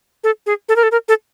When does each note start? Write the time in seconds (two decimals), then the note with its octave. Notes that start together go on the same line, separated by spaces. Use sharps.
0.24 A4
0.46 G#4
0.69 A4
0.76 A#4
0.83 A4
0.91 A#4
1.08 A4